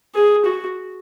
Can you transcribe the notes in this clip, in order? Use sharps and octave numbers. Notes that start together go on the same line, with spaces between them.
G#4
F#4